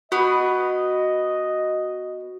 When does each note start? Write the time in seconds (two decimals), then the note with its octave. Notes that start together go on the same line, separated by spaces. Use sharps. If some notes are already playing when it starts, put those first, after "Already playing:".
0.12 B3 F#4 B4 D#5